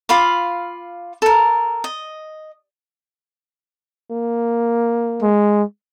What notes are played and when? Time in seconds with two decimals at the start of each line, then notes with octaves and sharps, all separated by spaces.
0.09 F4 F5 B5 D6
1.22 A4 A#4
1.84 D#5
4.11 A#3
5.22 G#3